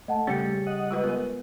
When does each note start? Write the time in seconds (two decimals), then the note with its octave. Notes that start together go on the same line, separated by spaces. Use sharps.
0.08 A3 D#5 F#5 A5
0.27 C#3 G3 C#4 G4 A6 C#7
0.67 D#5 F#5
0.91 G#3 F4 B4
1.04 B3 A#4